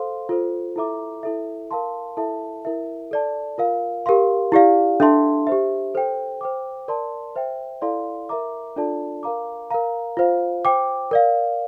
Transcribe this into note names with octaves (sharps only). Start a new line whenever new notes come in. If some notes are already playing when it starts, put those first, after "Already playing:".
Already playing: A4 C5 F5 C6
F4 A4 C5
E4 A4 E5 A#5 D6
E4 A4 E5
A#4 F5 A5 C6
E4 A4 E5 A5
E4 A#4 E5
A4 D5 A5
F4 A#4 F5
G4 A#4 F5 C6
E4 G4 D5 F5
D4 A4 E5 A5 C6
G4 C5 E5
A4 C5 G5
C5 G5 D6
A#4 D5 A5 C6
C5 E5 G5
E4 A4 D5 F5 C6
A#4 E5 A#5 D6
D4 F4 A4 D5 A5
A#4 F5 A#5 D6
A#4 F5 A#5
F4 C5 F5
C5 G5 D6
A#4 D5 F5